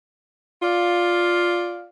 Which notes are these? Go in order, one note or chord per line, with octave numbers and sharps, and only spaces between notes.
F4 D5 F5